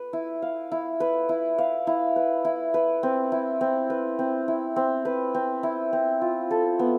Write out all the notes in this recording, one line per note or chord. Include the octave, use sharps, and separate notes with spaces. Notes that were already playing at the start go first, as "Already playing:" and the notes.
Already playing: B4
E4
F5
E4
B4
E4
F5
E4
B4
E4
B4
C4
E4
C4
B4
C4
E4
C4
B4
C4
E4
C4
F4
A4
B3